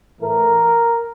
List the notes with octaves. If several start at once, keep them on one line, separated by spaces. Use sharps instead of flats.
A2 E3 A3 A#4